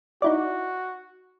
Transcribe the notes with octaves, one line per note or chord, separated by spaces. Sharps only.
D#4 E4 F#4 D5